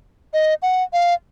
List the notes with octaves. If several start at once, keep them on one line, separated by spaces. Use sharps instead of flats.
D#5
F#5
F5